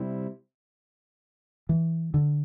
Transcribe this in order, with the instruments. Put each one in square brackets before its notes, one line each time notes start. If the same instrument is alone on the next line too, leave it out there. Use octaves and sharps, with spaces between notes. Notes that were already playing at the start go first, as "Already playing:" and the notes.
Already playing: [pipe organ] C3 G3 C4 E4
[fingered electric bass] E3
D3